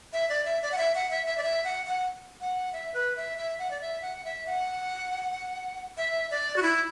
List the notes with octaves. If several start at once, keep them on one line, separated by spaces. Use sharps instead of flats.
E5
D5
E5
D5
F#5
E5
F#5
E5
E5
D5
E5
F#5
F#5
F#5
E5
B4
E5
E5
F#5
D5
E5
F#5
E5
F#5
E5
D5
F#4
E4